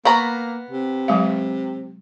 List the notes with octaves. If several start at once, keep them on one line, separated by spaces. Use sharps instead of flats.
A#3 B3 B4 A#5 C#6
C3
F#3 G#3 F5